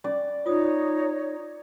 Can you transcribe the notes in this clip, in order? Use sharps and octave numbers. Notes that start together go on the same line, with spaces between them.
C#4 D5
D#4 F4 C#5 D#6